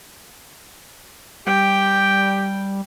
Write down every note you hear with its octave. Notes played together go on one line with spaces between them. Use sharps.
G3 G4 G5